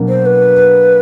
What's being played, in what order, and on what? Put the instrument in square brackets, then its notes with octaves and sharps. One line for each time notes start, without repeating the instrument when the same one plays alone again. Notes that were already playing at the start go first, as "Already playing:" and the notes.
Already playing: [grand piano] B2 F#3 A#3 D4
[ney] C5
B4